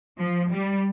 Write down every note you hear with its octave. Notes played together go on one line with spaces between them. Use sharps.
F3
G3